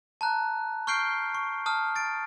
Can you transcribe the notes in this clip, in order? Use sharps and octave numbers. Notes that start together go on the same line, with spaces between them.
A5 A#5 F#6
C#6 F6 G6 C7 D7 G7
C#6
A5 D#6 F6
A6 D7